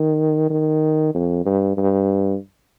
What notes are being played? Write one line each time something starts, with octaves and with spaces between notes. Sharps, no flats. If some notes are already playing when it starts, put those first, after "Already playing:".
Already playing: D#3
D#3
F2
G2
G2